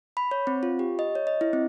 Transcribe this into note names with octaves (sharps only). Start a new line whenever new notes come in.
B5
C#5
C4
F4
G4
D#5
C#5
D#5
E4
C4